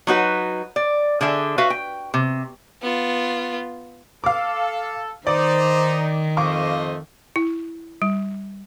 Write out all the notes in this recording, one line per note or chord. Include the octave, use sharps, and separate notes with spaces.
F#3 D#4 F#4 B4
D5
D3 G#4 E5
F#4 B4 E5 F5
G5
C3
B3 F4
A4 F5 D6
D#3 D#4 C5 D5
F2 A3 C5 D#5 F5 C#6 D6
E4
G3